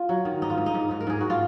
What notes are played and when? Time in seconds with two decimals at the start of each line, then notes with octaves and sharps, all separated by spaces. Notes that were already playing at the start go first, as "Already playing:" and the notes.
Already playing: F4
0.09 F#3
0.25 D#3
0.42 G#2 D#4
0.50 F4
0.58 G#2
0.66 D#4
0.74 G#2
0.91 G#2
1.00 A#4
1.07 G#2 G#4
1.21 F#4
1.30 F4